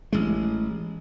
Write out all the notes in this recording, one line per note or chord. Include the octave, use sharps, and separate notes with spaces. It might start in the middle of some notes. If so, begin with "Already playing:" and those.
A1 G#3